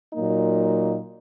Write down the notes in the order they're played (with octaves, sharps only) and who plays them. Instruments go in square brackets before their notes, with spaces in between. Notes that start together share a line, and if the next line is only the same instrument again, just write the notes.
[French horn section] A#2 F#3 A#3 D#4